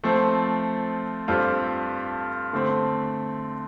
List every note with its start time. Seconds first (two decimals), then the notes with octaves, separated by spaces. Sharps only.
0.04 F3 A3 C4
1.28 G2 G3 C4 F4 A4
2.53 D3 A3 C4